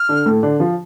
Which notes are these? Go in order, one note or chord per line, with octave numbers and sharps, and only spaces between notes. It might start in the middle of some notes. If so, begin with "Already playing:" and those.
Already playing: F6
D3 D4
A2 A3
D3 D4
F3 F4